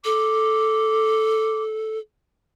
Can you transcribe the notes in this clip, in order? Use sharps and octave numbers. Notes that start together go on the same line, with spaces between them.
A4 D6